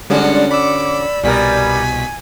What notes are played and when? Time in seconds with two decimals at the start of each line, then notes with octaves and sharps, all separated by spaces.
0.10 D3 G3 G#3 C#4 D4 F#4 D5
0.51 B5 D6 E6
1.23 C2 B2 G3 B3 A#4 G#5 B6